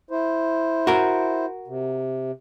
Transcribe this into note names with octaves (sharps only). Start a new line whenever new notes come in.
E4 C5
F#4 A#4
C3